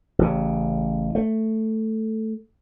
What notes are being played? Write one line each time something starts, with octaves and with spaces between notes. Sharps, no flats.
A1 C#3
A3